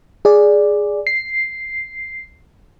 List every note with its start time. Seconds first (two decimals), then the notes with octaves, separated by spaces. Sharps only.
0.25 G#4 D5
1.07 C7